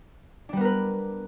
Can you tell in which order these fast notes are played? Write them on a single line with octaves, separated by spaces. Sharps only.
D4 G3 B3 A#4 B4